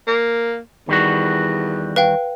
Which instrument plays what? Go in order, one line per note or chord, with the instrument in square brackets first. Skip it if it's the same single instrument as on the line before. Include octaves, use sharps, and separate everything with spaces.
[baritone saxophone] A#3
[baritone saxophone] E2 [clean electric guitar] D#3 G3 F#4
[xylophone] B4 F5 G5